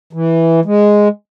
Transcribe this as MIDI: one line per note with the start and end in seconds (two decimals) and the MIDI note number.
0.13 0.60 52
0.65 1.08 56